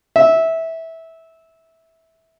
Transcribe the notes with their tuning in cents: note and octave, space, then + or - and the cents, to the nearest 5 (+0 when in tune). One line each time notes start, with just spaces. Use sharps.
E5 -15